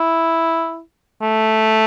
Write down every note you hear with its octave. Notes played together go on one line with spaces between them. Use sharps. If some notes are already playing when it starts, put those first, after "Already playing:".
Already playing: E4
A3